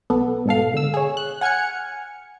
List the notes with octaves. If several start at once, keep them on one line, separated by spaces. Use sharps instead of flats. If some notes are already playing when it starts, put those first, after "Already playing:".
B1 B3 A4
G#2 B2 A4 F5
D3 E6
G#4 C#5
F#6
F#5 G#5 F6 G#6 C#7